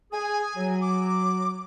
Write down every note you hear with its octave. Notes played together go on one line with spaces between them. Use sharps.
G#4 G#5
F#3
D6